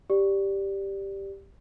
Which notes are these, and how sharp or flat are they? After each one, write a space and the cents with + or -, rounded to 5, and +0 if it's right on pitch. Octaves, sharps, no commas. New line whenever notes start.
G4 +0 D5 +0